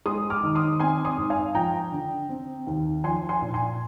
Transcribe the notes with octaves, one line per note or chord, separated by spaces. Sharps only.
G#3 C6 D#6
D6 F6
D#3
C6 D#6
C4 G#5 C6
C6 D#6
G#2
F5 G#5
F3 G5 A#5
D3
C4
D#2
F3 G#5 C6
G#5 C6
A#2
G#5 C6